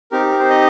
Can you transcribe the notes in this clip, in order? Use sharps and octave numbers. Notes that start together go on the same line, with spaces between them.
C4 D#4 G4 A#4
A#4
C5
D#5